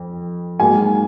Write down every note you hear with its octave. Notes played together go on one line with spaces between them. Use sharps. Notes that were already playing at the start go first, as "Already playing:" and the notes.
Already playing: F2
G#2 F#3 A#3 G#5